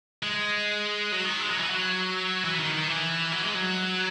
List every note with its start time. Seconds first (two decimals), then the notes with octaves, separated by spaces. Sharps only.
0.23 G#3
1.12 F#3
1.25 D#3
1.40 G#3
1.51 F#3
1.59 E3
1.70 F#3
2.44 E3
2.59 D#3
2.74 D#3
2.88 E3
3.32 F#3
3.43 G#3
3.54 F#3